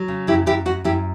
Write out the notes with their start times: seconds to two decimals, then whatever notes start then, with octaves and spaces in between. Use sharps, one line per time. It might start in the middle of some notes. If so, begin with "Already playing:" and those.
Already playing: F#3
0.08 C#3
0.27 F#2 E4 G4
0.46 F#2 E4 G4
0.65 F#2 F#4
0.84 F#2 E4 G4